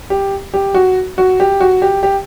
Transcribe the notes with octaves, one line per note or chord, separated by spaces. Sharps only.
G4
G4
F#4
F#4
G4
F#4
G4
G4